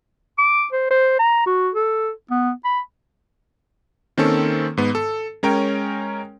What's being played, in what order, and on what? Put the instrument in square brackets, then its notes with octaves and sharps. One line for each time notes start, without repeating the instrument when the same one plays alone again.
[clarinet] D6
C5
C5
A#5
F#4
A4
B3
B5
[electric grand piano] D#3 A#3 C4 C#4 A4
G#2 B3
A4
G#3 C#4 A#4 C#5 G5